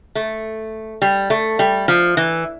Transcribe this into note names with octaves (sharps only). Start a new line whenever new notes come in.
A3
G3
A3
G3
F3
E3